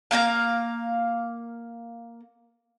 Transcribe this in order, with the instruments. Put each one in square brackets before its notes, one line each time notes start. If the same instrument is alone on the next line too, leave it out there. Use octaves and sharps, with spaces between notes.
[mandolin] A#3 F5 G#5 A#5